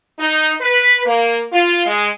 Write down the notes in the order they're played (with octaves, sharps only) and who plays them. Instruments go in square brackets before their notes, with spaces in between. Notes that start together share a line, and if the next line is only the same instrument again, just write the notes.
[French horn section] D#4
B4
A#3
F4
G#3